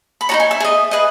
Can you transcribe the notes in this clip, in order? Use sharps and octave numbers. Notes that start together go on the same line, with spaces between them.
B5
D#4 F#4 C#5 A#5
G#5
E5
G#4 D#5
G#4 B4 D#5